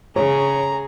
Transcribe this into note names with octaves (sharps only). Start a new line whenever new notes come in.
C#3 G#4 C#5 A#5